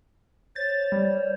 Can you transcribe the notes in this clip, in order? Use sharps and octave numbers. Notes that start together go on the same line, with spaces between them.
C5 C#5 A6
G3